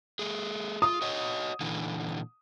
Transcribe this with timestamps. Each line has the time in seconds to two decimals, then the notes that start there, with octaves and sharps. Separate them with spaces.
0.19 A3 G#4
0.82 F4 D#6
1.01 F#4 C#5 D#5
1.60 A#2 D3 E3